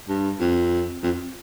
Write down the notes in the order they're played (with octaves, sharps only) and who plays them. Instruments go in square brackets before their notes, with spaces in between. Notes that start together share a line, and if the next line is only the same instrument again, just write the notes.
[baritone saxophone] G2
F2
F2